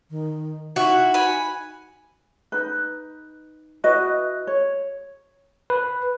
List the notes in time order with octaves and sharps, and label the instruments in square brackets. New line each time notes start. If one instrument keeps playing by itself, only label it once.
[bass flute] D#3
[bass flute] D#4 [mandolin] E4 [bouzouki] F#4
[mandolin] G#5 B5
[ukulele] D#4 B4
E4 F#4 B4 D#5
C#5
[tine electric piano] B4